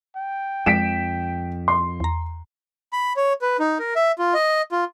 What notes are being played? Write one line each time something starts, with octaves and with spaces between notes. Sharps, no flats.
G5
F2 F3 G#3 B6 D7 E7
C6
E2 A#5
B5
C#5
B4
D#4
A#4
E5
F4
D#5
F4